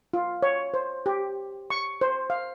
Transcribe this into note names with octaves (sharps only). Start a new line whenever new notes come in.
F4
C#5
C5
G4
C#6
C5
F5